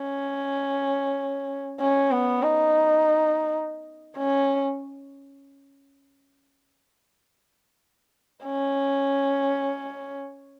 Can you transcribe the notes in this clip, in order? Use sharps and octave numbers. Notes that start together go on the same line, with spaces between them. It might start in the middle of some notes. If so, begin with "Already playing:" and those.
Already playing: C#4
C#4
B3
D#4
C#4
C#4